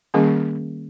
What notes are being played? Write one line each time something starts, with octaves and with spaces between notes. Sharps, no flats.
D#3 G3 A#3 C#4 G#4